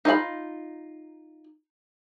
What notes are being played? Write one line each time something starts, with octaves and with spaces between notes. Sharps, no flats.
D#4 F4 E5 B5